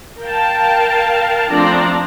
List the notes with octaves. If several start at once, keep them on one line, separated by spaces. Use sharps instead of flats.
A#4 F5 G5 A5
F3 A3 C4 D4 A#5